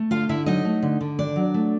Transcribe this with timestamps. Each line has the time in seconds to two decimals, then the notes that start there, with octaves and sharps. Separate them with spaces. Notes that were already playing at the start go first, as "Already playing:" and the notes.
Already playing: A3
0.11 D3 F4 F5
0.29 D3 E4 E5
0.46 F#3 D#4 D#5
0.65 A3
0.83 D3
1.01 D3
1.19 D#3 D4 D5
1.36 F#3
1.54 A3